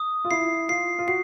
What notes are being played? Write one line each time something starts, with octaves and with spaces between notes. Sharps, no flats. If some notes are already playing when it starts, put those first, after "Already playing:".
Already playing: D#6
F4
E4 C7
F4 C7
F4
F#4 C7